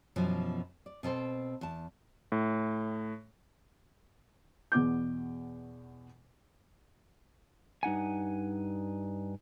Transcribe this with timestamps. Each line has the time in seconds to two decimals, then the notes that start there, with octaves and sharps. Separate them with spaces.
0.16 F#2 B2 E3 F3
0.86 D5
1.03 B2 C4 A4 C5
1.61 E2 A5
2.32 A2
4.72 E2 B2 D6 G6
7.83 G2 D#4 F#5 G#5